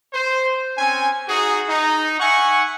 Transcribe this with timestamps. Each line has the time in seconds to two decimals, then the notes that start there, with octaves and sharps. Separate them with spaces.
0.12 C5
0.77 C4 C#4 G#5
1.28 D#4 F#4 G#4
1.68 D#4
2.19 E5 F#5 G#5 C#6